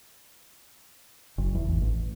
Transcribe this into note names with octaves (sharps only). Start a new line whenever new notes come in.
F#1
E2
G#1
A1